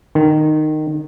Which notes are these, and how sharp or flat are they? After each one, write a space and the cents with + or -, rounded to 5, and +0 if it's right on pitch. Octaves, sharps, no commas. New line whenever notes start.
D#3 -15